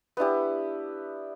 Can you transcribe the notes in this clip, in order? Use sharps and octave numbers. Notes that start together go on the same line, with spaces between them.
B3 D4 E4 G4